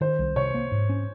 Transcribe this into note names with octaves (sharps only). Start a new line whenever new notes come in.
D#3 C5
C2
C3 C#5
A#3
G#2
C#4